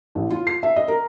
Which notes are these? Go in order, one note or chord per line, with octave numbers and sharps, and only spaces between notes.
A1
F4
C7
E5
D#5
A#4